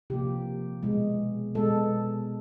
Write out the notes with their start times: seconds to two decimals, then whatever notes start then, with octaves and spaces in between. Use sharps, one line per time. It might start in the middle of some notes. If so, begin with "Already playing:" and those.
0.10 C3 F3 A#3 G4
0.83 B2 G#3
1.55 B2 G#3 A4